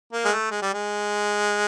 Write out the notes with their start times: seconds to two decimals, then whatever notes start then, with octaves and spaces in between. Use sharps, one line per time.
0.13 A#3
0.25 G#3
0.32 A3
0.51 G#3
0.62 G3
0.74 G#3